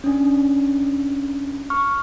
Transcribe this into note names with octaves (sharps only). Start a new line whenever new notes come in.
C#4 D4
C#6 F6